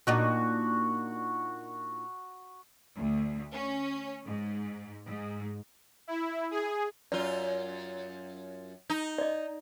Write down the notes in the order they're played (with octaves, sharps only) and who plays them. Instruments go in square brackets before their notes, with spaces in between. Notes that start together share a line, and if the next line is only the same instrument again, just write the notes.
[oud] A#2 D4 D#4 [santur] F#4
[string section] D2
C#4
G#2
G#2
[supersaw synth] E4
G#4
[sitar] F#2 F4 [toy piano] D5
[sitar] D#4
[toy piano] D5 D#5